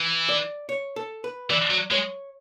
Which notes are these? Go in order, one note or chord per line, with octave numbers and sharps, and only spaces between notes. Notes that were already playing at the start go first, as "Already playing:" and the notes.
Already playing: E3
D5
C#5
A4
B4
E3 D5
F#3
G#3 C#5